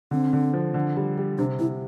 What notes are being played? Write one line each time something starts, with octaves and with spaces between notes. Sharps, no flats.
D3 C4
D3
F3
D3
G3
G3
C3 D4
C3 E4